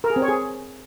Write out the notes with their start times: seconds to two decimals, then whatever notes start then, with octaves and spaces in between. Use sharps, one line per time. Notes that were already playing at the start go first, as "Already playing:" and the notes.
0.04 A#4
0.10 G#4
0.16 C4
0.22 C#5
0.28 G#4